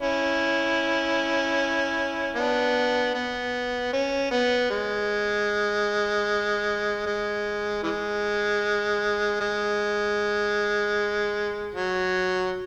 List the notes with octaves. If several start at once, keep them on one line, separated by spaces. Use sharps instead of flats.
C#4 E4
B3 D4
B3
C#4
B3
G#3
G#3
E3 G#3
G#3
F#3